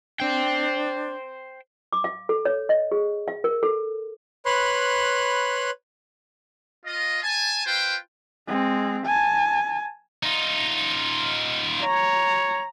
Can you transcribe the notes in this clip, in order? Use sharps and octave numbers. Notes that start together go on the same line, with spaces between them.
D4 C5 G5
D6
F5
A4
C#5
D#5
G#4
F5
A#4
A4
B4 C#5 B5 C6 F#6
F4 D#5
G#5 A5
F4 B4 C5 G5
G#3 C4
G#5 A5
D#4 F4
C#5 A#5